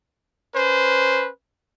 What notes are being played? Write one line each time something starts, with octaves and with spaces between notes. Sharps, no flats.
C#4 B4 C5